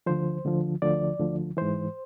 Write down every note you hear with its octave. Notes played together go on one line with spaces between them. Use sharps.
D2 D3 F3 C5
D2 D3 F3
D2 D3 F3 D5
D2 D3 F3
G#2 E3 C5